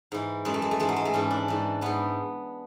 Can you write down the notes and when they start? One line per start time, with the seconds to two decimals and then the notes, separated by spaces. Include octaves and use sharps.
0.12 G#2 E3
0.45 F#2 E3 G#3
0.54 A3
0.62 G#3
0.71 A3
0.80 G#2 E3 G#3
0.89 F#3
0.96 G#3
1.05 A3
1.14 G#2 E3 C#4
1.31 D4
1.48 G#2 E3
1.81 G#2 E3 B3